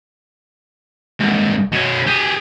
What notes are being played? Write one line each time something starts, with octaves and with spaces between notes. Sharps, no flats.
C2 G#2
B2 C#4
G4 G#4